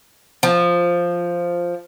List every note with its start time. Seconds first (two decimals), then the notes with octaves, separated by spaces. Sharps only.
0.43 F3